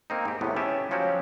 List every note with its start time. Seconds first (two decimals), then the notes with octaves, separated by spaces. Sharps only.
0.10 A#3 C4 D#4
0.25 G#2 G4
0.41 E2 A2 C3 B3
0.56 C#4 G4 G#4 E5 A5
0.91 F3 F#3 C#4 F#4 G4